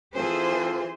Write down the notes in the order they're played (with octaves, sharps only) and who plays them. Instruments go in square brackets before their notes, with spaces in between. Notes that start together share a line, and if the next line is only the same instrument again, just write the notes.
[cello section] E3 G#4 C5 [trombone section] C4 F4 A4